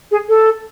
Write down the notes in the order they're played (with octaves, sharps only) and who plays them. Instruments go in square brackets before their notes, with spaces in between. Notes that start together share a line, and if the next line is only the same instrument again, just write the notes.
[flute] G#4
A4